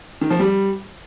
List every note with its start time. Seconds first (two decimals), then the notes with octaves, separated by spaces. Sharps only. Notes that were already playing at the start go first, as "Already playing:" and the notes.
0.21 D#3
0.30 F3
0.40 G3